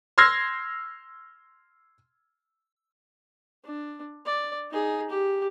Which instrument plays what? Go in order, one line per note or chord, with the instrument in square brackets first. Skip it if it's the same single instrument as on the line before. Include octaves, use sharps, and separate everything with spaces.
[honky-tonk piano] C6 E6 F6 G#6 A#6 C7
[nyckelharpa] D4
D5
D#4 G#4
G4